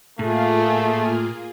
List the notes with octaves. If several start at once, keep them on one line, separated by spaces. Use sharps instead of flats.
A2 A3 A#3 F4 G#4